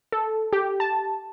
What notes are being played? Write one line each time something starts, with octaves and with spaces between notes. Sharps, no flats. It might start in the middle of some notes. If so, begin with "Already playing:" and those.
A4
G4
A5